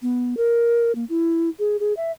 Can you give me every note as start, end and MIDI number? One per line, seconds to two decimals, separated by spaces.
0.02 0.37 59
0.37 0.92 70
0.95 1.05 58
1.09 1.49 64
1.59 1.77 68
1.80 1.93 68
1.97 2.12 76